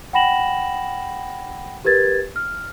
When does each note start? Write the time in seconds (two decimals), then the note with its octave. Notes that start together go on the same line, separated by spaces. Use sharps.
0.13 F#5 G5 B5 A#6 E7 F#7
1.85 G4 A#4 B4 G#6 A6
2.36 F6